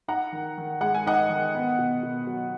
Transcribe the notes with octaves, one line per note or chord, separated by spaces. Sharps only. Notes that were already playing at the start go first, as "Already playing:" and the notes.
D#4 F#5 A#5
D#3
D#3
G#3 F#5
G#5
D#4 D#5 F#5
D#3
B3
B2
B2
F#3